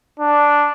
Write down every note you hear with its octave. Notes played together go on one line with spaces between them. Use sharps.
D4